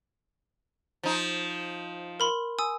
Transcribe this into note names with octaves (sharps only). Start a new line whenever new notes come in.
F3 D#4
A#4 B5 C6
G#5 D#6 E6